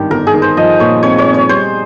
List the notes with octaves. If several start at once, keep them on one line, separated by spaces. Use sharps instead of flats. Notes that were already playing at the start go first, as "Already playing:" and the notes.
Already playing: G#1 G2 D#3 G4
G1 A#4
G#4
D#3
C5
F3 D#5
A#2 C#5
C4 C#5
C#5
C4
C#5
G3 C5